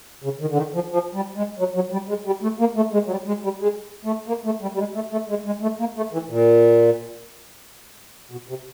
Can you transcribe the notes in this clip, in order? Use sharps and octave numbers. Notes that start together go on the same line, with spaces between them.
C#3
D#3
D3
D#3
F3
F3
G3
G#3
F#3
F#3
G3
G#3
G3
A3
A#3
A3
G#3
F#3
G3
G#3
G3
G#3
A3
A#3
A3
G3
G3
G#3
A3
A3
G#3
G#3
A3
A#3
A3
E3
A#2
B2
C3